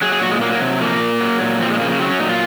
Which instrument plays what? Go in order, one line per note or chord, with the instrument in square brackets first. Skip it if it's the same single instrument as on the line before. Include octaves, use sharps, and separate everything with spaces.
[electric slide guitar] F#3 G#4
G#4
A#2 F#4
G#3
F#3 A#3
A#3
C3
F3 A#3
A#2
F#3
A#2
F3 C4
G#3
C#3 A#3
A#3
F#3 C4
C#4
A#2 D#4
F4